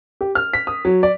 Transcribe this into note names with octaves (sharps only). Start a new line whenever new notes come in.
G4
F6
B6
D#6
F#3
D5